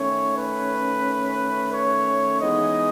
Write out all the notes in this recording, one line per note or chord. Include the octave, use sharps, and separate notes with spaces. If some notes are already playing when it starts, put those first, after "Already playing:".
Already playing: D#3 A3 C#4 C#5
B4
C#5
E3 G#3 B3 D#4 D#5